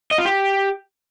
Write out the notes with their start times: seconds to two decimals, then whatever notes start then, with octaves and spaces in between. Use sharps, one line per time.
0.11 D#5
0.18 F4
0.25 G4